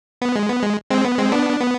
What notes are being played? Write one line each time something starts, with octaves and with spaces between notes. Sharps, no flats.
B3
G#3
B3
G#3
G#3 C4
B3
G#3 C4
B3 D4
B3